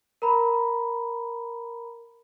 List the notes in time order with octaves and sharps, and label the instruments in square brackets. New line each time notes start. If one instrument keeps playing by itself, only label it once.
[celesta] A#4 A#5 B5